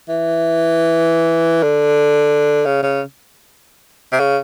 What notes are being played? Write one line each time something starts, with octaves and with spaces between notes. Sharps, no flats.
E3
D3
C#3
C#3
C3
C#3